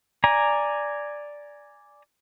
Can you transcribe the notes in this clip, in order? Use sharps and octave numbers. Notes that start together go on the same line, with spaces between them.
D5 G#5 A#5